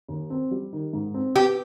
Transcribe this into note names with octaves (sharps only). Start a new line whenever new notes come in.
D#2
C4
G3
D#3
G#2
C4
B3 G4